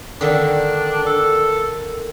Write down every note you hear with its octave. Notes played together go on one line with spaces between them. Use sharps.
D3 D#3 D4
A4